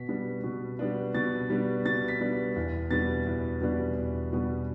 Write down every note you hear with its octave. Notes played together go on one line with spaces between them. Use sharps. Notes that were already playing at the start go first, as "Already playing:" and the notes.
Already playing: B2 B6
G3 B3 D4
B2
G3 B3 D4
B2 A6
G3 B3 D4
B2 A6
B6
G3 B3 D4
E2
B2 G3 B3 D4 A6
E2
B2 G3 B3 D4
E2
B2 G3 B3 D4